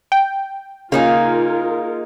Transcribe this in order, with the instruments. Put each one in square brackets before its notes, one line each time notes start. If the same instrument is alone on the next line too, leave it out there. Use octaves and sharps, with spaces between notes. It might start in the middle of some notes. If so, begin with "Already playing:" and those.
[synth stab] G5
[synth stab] C#3 [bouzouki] A#3 D#4 G#4 [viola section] F4 A#4